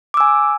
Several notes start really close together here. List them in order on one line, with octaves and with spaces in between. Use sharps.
D6 E6 G#5